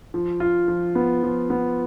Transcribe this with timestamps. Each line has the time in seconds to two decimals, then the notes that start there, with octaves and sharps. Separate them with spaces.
0.14 F3
0.40 F4
0.68 F3
0.95 B3
1.23 F3
1.50 B3